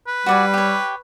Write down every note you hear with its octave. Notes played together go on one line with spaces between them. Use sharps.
B4
G3 F#4 D5 G#5
G4 C#5